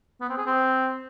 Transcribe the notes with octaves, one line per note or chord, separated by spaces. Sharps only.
B3
C4
G#4
C4